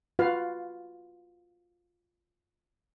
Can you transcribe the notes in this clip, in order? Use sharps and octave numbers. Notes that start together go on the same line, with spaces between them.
F4 F#4 B4 F5